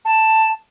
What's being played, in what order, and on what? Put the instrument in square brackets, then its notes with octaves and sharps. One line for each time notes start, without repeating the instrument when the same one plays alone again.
[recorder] A5